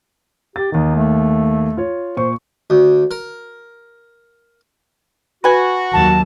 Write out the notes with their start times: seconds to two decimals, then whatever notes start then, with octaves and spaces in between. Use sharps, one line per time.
0.56 G4 A6
0.72 D#2 D#3 D#4
0.95 A3
1.77 F4 C#5
2.17 A#2 C5 C#6
2.70 D2
3.11 A#4
5.44 F#4 B4 G#5
5.93 D#2 F#3 A5